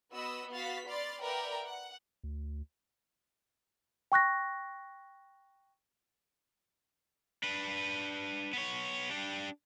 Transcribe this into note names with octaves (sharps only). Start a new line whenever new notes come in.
B3 F#4 B4 D#5 B5 E6
B3 F#4 F5 A6 B6
D5 B5 C6 F6 A6
A#4 B4 D5 E5 F#5 G5
F#5
D2
G5 C#6 F#6 A#6
D4 B4
B3 C#5
D4 G4